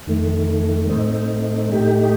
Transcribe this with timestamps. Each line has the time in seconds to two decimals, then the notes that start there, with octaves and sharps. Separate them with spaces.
0.07 F2 D#3 A3
0.89 A2 A3 C4 D#4
1.72 A2 A3 D#4 G4